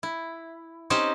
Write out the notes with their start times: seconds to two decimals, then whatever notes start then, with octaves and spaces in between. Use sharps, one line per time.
0.03 E4
0.90 C4 C#4 D#4 G4 C5